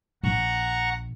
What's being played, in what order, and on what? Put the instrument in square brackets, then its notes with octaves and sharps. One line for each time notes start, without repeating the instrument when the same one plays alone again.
[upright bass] A#1 [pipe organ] F#5 A#5 C#6